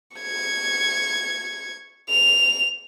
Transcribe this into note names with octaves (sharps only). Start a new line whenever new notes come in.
C#6 G#6
F7